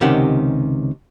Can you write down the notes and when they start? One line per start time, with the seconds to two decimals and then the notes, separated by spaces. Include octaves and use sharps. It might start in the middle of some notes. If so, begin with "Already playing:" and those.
0.01 C#2 C3 D#3 C#4 G4 F#5